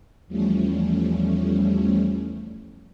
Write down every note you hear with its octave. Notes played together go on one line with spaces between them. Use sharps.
E2 F3 G3 A3 C#4